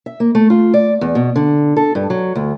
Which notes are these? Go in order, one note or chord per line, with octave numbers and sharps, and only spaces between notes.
E5
A#3
A3
F4
D5
E2
B2
D3
A4
G2
F#3
D2